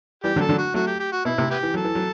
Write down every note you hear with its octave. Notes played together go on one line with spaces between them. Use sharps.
E3 G3 G4
D3 F#3
A4
D3 F#3
F#4
F#3 A3 F#4
G4
G4
F#4
B2 E4
A2 C3
B3 E4 G4
E3
F#3 A4
E3
F#3